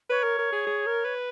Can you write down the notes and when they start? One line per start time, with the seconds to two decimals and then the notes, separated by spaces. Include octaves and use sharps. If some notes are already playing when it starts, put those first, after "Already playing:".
0.10 B4 C#5
0.24 A#4
0.39 A#4
0.52 G#4
0.67 G#4
0.87 A#4
1.05 B4